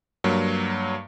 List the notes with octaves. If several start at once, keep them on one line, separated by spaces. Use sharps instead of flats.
G2 F#3 A#3